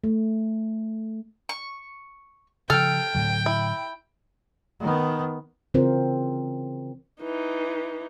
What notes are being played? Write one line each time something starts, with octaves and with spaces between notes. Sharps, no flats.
A3
C#6
C#3 F3 A4 G5 F6
A2 D3 F#3
E4
D#3 B3
C#3 E3 C4 F4 A#4 C5
E3 D#4